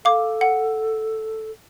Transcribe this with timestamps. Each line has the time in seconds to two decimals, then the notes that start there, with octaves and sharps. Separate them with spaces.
0.05 A4 F5 D6
0.41 F#5